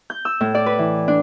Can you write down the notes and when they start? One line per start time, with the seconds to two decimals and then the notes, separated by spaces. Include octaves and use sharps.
0.10 G6
0.25 E6
0.41 A2
0.55 D5
0.66 B4
0.79 E3
1.08 D4